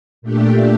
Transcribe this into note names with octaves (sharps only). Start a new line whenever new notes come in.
A#2 A3 D4 G4